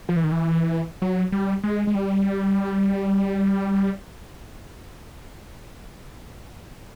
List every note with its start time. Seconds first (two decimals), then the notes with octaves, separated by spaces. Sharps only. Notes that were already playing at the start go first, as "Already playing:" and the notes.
0.09 F3
0.16 E3
0.24 D#3
0.32 E3
1.02 F#3
1.32 G3
1.63 G#3
1.87 G#3
1.95 G3